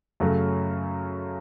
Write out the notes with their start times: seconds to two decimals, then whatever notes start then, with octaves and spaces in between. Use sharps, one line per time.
0.20 F#2 C#3 F#3 A3 C#4